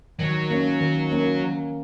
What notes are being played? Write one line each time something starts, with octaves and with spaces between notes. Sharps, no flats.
D#3 F#3
A#3 C#4
D#3
A#3 C#4